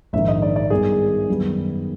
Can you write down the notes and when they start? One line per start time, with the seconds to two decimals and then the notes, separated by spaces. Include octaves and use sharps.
0.13 A#1 G#2 D#3 E5
0.28 D#5
0.42 D5
0.56 D5
0.70 G2 D#3 G#3 B3 G#4
1.29 F#2 D#3 G3 B3